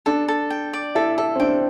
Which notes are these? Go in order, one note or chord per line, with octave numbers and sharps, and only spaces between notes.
D4 A4
A4
G5
D5
E4 A4
E4 A4
C4
D4 G5